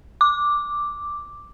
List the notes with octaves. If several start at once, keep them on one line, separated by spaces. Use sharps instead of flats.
D6